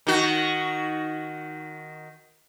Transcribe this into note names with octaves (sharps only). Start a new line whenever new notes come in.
D#3 F#4